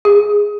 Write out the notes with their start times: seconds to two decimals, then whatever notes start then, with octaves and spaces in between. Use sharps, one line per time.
0.05 G#4